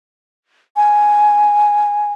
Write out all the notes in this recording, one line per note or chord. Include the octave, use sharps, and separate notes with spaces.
G#5